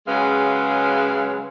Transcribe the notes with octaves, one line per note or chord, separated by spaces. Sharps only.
C#3 F#3 G#3 B4 F5